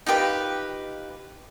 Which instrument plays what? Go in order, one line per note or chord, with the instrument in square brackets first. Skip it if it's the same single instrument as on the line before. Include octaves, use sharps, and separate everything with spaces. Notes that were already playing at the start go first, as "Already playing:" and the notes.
[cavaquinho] D#4 F4 G4 B4